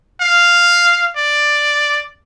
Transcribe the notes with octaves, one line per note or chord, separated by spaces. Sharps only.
F5
D5